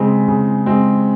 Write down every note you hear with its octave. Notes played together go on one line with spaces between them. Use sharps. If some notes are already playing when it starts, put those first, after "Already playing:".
Already playing: C#3 G#3 C4
C#3
G#3 C4